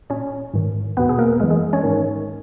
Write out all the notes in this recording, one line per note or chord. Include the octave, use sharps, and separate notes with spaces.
A#2 C#4 C#5
G#2 D#3
E2 B2 B3 B4
G#4
A#3 A#4
F#2 E3 G#3 G#4
G#3 G#4
C#4 C#5
G#2 D#3